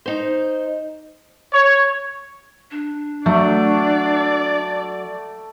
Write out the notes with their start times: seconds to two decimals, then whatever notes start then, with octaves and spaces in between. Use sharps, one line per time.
0.06 D#4 C5
1.53 C#5
2.71 D4
3.26 F#3 A3 D5